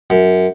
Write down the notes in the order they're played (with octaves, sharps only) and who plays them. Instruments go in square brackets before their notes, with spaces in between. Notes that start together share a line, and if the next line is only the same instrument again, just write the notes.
[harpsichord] F#2